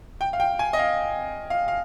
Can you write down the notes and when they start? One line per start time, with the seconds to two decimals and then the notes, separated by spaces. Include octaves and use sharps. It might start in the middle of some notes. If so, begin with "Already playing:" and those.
0.21 G5
0.33 F5
0.40 G5
0.59 G#5
0.73 D#5
0.79 F5
1.50 F5
1.68 F5